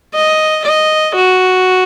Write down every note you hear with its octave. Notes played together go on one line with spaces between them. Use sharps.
D#5
D#5
F#4